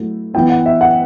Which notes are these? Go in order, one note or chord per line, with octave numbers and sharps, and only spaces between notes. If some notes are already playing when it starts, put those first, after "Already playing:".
Already playing: F#3 A3 E4
E3 B3 E4 G5
F#5
E5
F#5